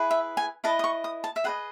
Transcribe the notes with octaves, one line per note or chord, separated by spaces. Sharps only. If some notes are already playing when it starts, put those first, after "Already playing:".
Already playing: E4 G#4 B4
E5
G#5
E4 B4 D#5 A5
D#6
C#6
D#6
A5
E5
G#4 B4 D#5 F#5